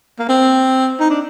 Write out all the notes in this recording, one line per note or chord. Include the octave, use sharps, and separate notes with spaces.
A#3
C4
D#4
D4